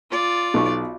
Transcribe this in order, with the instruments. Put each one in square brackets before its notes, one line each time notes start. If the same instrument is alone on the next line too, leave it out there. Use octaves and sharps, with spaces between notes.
[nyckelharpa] F4 D5
[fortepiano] B1 C#6